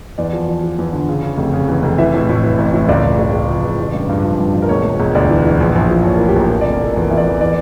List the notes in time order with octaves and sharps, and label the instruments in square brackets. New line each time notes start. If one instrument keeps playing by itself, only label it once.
[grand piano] E2 D5
F3
F3
F3
E2
D3
C#3
C#3
F1
C#3
E2
F1
E3 E5
A2
A2
E3
A1
A2
C#2 D5
C#2
C#2
C#2
F3
C#2
A1
G2
G2
F3
G2
F3
A#4
E1 C#5
E1
E1
D2 D5
E3
E3
A#1
A#1
F3
A#1 C#5
A2 A#4
G4
A#1 A#4
F3 A#4
F1 D5
A#4
F1 A4
E2 A#4
E2 E5
D5
E2
E3 D5